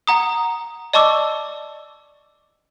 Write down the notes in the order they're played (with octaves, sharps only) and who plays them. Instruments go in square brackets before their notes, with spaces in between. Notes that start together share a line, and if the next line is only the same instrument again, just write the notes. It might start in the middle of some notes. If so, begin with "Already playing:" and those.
[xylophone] F#5 A#5 D#6
D5 D#5 A5 C#6 D6 E6